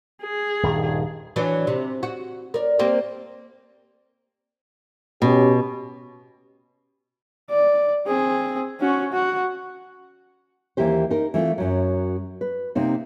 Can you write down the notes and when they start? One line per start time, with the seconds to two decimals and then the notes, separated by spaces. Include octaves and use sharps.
0.22 G#4
0.63 D#1 G2 D#3
1.36 E3 F#3 D4
1.67 C3
2.03 F#4
2.54 A#4 D5
2.79 G3 A#3 C4
5.22 B2 C#4 G4
7.51 D5
8.07 C4 G#4
8.80 C#4 F#4
9.13 F#4
10.77 D#2 E3 A#3 G4 C5
11.10 D#4 A#4
11.34 E3 A3 C4 F4
11.58 F#2 F#3
12.41 B4
12.75 C3 A#3 C4 D#4